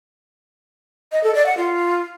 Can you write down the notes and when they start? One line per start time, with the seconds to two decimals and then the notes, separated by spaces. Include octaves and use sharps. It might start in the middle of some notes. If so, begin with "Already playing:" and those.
1.12 D#5
1.23 A4
1.35 D5
1.46 F#5
1.57 F4